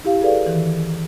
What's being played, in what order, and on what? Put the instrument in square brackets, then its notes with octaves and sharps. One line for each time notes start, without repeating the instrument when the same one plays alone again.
[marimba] E4 G4 F5
G#4 A4 B4 D5 F5
D#3 E3